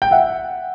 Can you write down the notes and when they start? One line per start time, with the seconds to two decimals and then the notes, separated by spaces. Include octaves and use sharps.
0.02 G5
0.11 E5 F#5